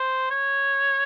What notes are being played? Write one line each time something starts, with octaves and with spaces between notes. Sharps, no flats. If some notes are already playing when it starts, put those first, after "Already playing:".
Already playing: C5
C#5